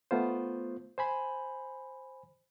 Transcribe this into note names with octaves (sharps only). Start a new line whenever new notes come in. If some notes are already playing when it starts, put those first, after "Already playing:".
A3 B3 F4 C5
C5 G#5 B5